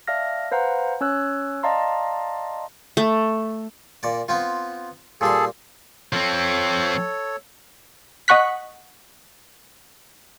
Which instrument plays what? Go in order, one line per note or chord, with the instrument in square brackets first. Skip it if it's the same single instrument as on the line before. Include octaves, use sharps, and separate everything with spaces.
[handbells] D5 E5 F5 A5 F6 A#6
B4 C5 F5 F#5 A#5
C#4 C#5 E6 F#6
D5 D#5 F5 A5 A#5 C6
[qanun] A3
[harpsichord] A#2 D5
B3 C4 F4
[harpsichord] A#2 G3 C6 [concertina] G#4 A4
[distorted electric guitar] F3 C4 [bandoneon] A4 C#5
[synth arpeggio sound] D#5 F#5 C#6 F#6 B6